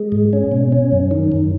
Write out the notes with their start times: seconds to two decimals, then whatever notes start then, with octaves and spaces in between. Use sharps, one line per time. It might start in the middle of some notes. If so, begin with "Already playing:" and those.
Already playing: G#3
0.12 G#2
0.33 C#4
0.52 B2
0.72 C#4
0.92 F#2
1.11 D#3
1.32 F#2